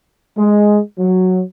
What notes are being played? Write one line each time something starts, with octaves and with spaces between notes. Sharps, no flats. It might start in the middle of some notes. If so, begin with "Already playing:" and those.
G#3
F#3